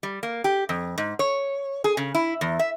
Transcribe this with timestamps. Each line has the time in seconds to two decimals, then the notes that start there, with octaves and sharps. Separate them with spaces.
0.03 G3
0.23 A#3
0.44 G4
0.69 F2
0.98 G#2
1.19 C#5
1.84 G#4
1.97 C#3
2.15 E4
2.41 E2
2.59 E5